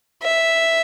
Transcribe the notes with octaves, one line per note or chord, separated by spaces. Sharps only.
E5